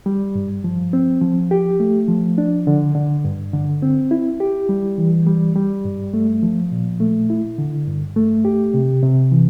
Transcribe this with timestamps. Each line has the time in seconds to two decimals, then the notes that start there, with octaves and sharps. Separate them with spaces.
0.06 G3
0.35 G2
0.64 F3
0.93 C4
1.22 F3
1.51 G4
1.80 A3
2.08 F3
2.38 D4
2.67 D3
2.95 D3
3.25 G2
3.53 D3
3.82 C4
4.11 E4
4.40 G4
4.69 G3
4.98 E3
5.27 G3
5.56 G3
5.85 G2
6.14 A3
6.43 F3
6.72 A#2
7.00 A3
7.30 E4
7.58 D3
7.87 G2
8.16 A3
8.45 G4
8.74 C3
9.03 C3
9.32 E3